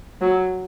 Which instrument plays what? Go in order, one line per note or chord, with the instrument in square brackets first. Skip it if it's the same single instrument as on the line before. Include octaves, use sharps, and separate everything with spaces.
[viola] F#3